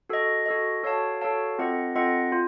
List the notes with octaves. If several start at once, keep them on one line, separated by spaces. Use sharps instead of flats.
F#4 A4 D#5
F#4 A4 D#5
F#4 A4 C#5 F5 A5
F#4 A4 C#5 F5 A5
C4 F4 A4 D#5 F#5
C4 F4 A4 D#5 F#5
F4